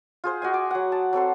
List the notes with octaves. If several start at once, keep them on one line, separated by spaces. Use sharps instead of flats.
F4 G#4 C5
F#4 D#5 G#5
D6
F#3 F#5
A5
F#3 C4 A4 C5